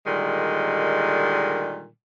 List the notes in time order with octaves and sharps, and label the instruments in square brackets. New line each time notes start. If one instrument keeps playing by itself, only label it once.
[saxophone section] A#2 D3 D#3 G3 G#3